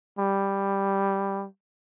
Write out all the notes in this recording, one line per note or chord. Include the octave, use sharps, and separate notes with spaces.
G3